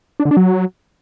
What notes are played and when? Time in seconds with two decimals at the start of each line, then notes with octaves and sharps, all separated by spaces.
0.20 D4
0.25 D3
0.31 D4
0.37 F#3